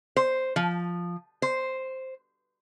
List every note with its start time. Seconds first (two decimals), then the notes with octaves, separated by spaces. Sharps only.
0.16 C5
0.56 F3
1.42 C5